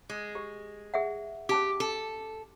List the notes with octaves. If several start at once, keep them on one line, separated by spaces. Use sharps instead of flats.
G#3
G4
G#4 E5 F#5
C#4 G4 A5 D6
A4